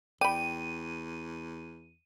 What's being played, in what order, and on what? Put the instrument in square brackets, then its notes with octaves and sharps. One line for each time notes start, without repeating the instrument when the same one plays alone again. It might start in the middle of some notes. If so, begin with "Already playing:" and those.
[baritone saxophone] E2 [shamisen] D5 B5 [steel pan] G5 [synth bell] D#7